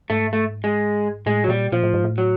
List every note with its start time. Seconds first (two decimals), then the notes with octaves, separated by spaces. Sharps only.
0.10 G#2 A3
0.33 A3
0.64 G#3
1.26 A2 G#3
1.44 F#3
1.49 A#2 G3
1.72 A#2 F3
1.83 A2
1.94 G#2
2.04 A2
2.18 F#3